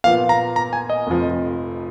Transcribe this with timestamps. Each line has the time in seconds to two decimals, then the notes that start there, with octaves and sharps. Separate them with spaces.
0.04 A#2 F3 B3 F4 F5
0.29 A#5
0.56 A#5
0.73 G#5
0.90 D#5
1.07 F1 F2 F3